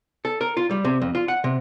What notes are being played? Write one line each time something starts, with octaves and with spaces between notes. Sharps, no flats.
A4
A#4
F4
G3
C3
F2
F4
F#5
C3